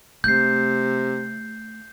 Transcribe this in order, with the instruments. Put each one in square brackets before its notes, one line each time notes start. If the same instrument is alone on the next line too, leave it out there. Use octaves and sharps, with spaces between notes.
[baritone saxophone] C3 [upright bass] A3 [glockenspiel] G6 C7